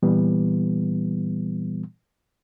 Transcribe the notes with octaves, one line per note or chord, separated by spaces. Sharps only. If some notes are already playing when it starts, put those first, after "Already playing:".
A#2 E3 G3 B3